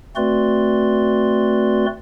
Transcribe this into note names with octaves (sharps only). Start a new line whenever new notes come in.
A3 C4 F#4 B4 D5 C6